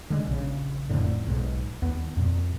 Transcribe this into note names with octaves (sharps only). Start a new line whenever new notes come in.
D3 G#3
A#1 C#3
F#1 F2 A2 D3
B1 G#2
D#2 B3
F2 A#2